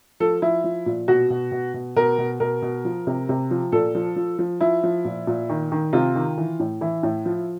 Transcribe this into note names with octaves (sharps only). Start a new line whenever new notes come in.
F3 A4
F3 E4
F3
A#2
B2 F#4
B2
B2
B2
B2 A#4
B2
B2 A#4
B2
F3
C3
C3
F3
A#2 A4
F3
F3
F3
F3 E4
F3
A#2
A#2
D#3
D#3
C3 F4
D#3
E3
A2
E3 E4
A2
F3